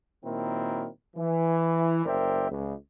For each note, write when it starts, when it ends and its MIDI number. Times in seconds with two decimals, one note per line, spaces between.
0.24 0.88 46
0.24 0.88 51
0.24 0.88 54
0.24 0.88 60
0.24 0.88 64
0.24 0.88 70
1.16 2.03 52
2.05 2.50 30
2.05 2.50 70
2.05 2.50 72
2.05 2.50 74
2.05 2.50 76
2.05 2.50 79
2.50 2.74 37